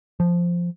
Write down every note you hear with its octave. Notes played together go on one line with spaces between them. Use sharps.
F3